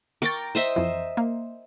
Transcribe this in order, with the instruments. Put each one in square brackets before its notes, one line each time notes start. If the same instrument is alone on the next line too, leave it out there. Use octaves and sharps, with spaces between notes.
[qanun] A#4 G5 D6 [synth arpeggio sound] C#6 A6
[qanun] C5 D#5 E5
[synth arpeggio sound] F2 E3
A#3